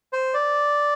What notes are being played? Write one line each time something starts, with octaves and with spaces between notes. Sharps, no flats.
C5
D5